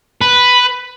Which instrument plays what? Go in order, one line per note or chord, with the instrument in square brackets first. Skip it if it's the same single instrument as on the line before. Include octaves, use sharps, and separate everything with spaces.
[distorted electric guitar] B4